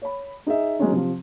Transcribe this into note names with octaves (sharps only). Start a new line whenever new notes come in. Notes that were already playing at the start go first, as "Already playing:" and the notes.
C#5 B5
D#4 G#4 D#5 E5
D#3 F#3 G#3 B3 C#4 D#4
C3 F3